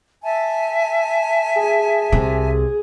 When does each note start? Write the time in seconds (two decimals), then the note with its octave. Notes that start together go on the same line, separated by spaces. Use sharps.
0.23 E5 G#5 A5
1.56 G#4
2.12 C2 C3